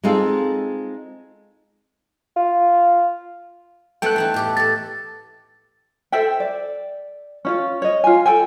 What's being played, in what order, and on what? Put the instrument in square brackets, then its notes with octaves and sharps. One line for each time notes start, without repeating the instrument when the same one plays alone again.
[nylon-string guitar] G#3 C4 D#4 F4 G#4 A4
[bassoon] F4
[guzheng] A3 B3 A4 [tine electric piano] G5 F#6
[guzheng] E3 A3 D#4
A2 G4 A4
[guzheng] G4 A4 [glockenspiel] A6
[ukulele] A4 C5 E5 G5
D5
C#4 E4 F4
C#5 D#5
F4 G#5
A4 G5 G#5